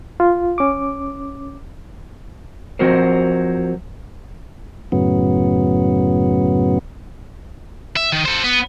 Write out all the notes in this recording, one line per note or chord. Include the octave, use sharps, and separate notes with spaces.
F4
C#4 D6
F3 F#3 C4 F#4 A#4 C5
F#2 A2 C#3 F#3 B3
E5
D#3
A4 C5
B3